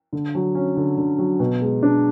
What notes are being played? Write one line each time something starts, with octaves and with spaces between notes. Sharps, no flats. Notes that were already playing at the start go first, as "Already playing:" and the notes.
D3
F#3
C#4
D3
D3
F#3
B2
G#3
D4